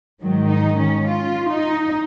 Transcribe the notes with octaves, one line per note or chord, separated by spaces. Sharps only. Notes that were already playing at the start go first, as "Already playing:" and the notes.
G#2 D#3 F#3
D#4
C#4
F4
D#4